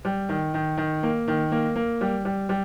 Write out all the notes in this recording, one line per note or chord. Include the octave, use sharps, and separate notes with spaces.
G3
D#3
D#3
D#3
A#3
D#3
A#3
A#3
G3
G3
G3